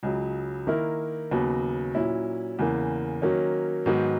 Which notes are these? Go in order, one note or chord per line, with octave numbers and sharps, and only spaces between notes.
C#2 C#3 F#3
D#3 A#3 E4 A#4
D#2 C#3 F#3 B3
A#2 F#3 C#4 E4
E2 C#3 E3 A#3
D#3 F#3 A#3 C#4
G#2 D#3 F#3 B3